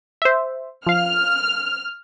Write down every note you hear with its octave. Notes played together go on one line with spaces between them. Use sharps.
C5 E5
F3 F5 F6